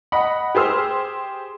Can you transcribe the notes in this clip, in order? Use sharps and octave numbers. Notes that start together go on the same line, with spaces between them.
D#5 F#5 B5
G4 G#4 C5 E6 F6